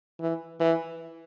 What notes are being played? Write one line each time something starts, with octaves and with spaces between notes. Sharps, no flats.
E3
E3